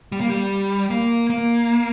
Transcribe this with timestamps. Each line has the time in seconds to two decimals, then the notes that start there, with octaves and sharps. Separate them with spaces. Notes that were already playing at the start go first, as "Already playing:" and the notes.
0.12 G3
0.21 A#3
0.29 G3
0.90 A#3
1.30 A#3